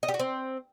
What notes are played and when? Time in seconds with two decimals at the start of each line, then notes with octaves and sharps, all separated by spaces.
0.03 D#5
0.08 G4
0.14 F#4
0.20 C4